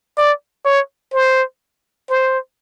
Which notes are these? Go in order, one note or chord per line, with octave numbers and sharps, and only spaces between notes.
D5
C#5
C5
C5